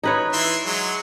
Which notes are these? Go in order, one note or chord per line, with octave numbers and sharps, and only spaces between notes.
D#4 B4 C#5
E3 E5 C6
F#3 G#3